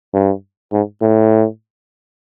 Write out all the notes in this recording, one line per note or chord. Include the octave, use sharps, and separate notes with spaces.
G2
G#2
A2